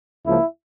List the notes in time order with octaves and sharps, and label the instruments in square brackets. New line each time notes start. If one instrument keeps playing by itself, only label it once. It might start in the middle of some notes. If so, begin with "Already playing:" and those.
[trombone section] C#2 C#3 F3 A#3 E4